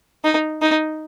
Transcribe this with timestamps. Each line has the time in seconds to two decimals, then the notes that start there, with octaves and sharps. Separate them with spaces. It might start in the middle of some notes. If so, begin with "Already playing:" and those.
0.24 D#4
0.62 D#4